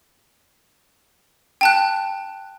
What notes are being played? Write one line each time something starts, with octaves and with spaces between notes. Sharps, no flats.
G5 A5 F#6